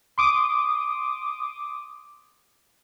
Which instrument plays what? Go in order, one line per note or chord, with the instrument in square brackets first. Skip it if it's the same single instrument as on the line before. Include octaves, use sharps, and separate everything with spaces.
[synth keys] C6 D6 D#6